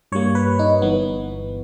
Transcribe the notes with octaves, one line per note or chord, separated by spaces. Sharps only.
G2 G3 A#3 C#5
B4
D#4
G1 G2 E3 B3